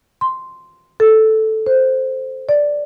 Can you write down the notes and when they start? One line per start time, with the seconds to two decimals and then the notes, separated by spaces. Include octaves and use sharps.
0.21 C6
1.00 A4
1.67 C5
2.49 D5